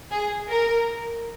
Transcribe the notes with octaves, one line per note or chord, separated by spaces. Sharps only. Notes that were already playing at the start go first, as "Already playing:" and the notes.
G#4
A#4